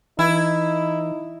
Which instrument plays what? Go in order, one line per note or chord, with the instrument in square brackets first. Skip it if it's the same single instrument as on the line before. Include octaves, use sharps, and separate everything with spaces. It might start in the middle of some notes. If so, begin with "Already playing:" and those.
[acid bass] E3 [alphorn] D#4 [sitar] E4